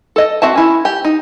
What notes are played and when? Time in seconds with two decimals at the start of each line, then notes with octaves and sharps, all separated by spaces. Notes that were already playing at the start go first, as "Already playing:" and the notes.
0.16 A4 D#5
0.42 C4 F#4 E5 A5
0.56 C#4 E4
0.85 G4
1.05 D#4